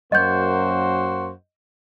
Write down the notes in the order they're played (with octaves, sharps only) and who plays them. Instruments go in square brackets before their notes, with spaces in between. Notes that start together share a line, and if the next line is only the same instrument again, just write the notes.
[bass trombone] F#2 [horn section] A#3 F#4 C5 [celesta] D#5 G6